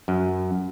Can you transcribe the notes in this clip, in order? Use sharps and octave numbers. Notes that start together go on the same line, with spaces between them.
F#2